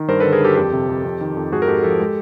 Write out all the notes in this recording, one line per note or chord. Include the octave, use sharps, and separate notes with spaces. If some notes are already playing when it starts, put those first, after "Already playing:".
Already playing: D#3
G2 A#4 C5
D3 A4 B4
G#4 A#4
G2 G4 A4
F2 G4 A4
C3
F2
F2
D#3
F2
G#2 F#4 G#4
A#4
G#2 G4 A4
F3 G4 A4
G#3